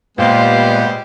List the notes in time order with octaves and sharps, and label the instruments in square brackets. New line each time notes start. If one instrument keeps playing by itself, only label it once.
[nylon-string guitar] A#2 [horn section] G3 G4 C5 [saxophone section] G#3 B3 [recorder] F5